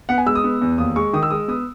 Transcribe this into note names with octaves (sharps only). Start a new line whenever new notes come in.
B3 F#5
G#5
G#3 E6
D#6
B3
E2
D#2 D#6
G#3 C#6
D#3 D#6
E6
G#3 D#6
B3 D#6